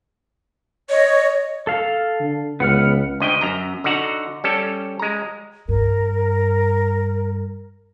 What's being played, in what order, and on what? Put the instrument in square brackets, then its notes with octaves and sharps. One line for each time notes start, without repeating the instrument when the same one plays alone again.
[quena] C#5 [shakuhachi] D#5
[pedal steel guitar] A4 F5
[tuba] D3
[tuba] C#2 [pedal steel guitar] B3 F#5 F6
[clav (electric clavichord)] D2 D#5 G5
F#2 A#5
D3 D#4 F#4 F#5 A#5
G3 C#4 A4
G#3 A#5
[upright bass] G2 [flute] A#4